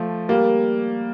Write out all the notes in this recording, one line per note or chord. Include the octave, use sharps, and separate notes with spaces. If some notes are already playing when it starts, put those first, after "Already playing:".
Already playing: F3 A3
G3 A#3